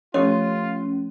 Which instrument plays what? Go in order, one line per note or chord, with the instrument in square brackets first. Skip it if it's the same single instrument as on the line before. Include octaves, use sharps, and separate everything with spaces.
[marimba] F3 A3 [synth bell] C#4 [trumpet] F4 [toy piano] G4 A4 C#5